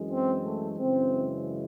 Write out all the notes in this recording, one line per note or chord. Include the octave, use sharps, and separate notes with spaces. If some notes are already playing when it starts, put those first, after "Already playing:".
Already playing: F#2 E3 G#3
C4
A3
F#2 C#3 E3 G#3 C4